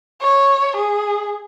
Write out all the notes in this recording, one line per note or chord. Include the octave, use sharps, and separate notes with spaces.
C#5
G#4